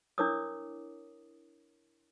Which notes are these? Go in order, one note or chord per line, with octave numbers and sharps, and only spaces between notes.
D4 E4 A#4 C#5 D6 D#6